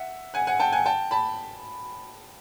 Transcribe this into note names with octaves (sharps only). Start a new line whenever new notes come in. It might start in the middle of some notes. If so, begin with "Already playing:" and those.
Already playing: E5 F#5
F#5 G#5
F#5 G#5
G5 A5
F#5 G#5
G5 A5
A5 B5